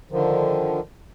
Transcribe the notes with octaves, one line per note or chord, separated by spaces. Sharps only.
D3 D#3 F3